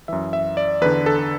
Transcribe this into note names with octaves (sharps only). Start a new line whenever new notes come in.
F#2 E3 E5
E5
D5
E2 D3 B4
A4